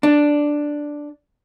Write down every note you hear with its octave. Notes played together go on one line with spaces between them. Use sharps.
D4